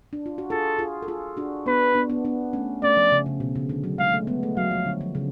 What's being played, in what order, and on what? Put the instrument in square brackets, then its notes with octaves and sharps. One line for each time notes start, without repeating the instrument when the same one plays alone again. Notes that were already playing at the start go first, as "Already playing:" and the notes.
[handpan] D4
F4
F#4
[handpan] F4 G#4 [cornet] A4
[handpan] F4 G#4
A4
F4 G#4
D4 F#4
[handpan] B3 D4 [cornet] B4
[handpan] B3 D4
B3 D4
B3 D4
A3 C#4
[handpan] A3 C#4 [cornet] D5
[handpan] F3
C#3
C#3
B2
C#3
D3
F#3
[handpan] G#3 [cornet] F5
[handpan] A3
G#3 B3
A3
[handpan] F#3 [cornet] F5
[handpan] F3
D3
F3
C#3